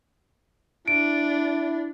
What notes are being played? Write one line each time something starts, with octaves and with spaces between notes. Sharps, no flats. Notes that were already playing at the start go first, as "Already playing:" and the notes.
D4 E4 D7